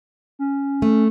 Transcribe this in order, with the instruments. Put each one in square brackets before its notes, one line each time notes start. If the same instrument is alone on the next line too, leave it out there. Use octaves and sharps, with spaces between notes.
[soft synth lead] C#4
[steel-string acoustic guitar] A3